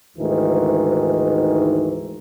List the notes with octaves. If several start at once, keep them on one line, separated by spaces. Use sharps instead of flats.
D2 G#2 D#3 E3